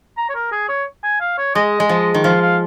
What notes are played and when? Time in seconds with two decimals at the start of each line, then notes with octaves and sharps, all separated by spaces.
0.17 A#5
0.29 C#5
0.35 A#4
0.52 G#4
0.69 C#5
1.03 G#5
1.20 F5
1.38 C#5
1.55 G#3 D#5
1.80 G#3
1.89 F3
2.14 D#3
2.24 F3 F5
2.42 F5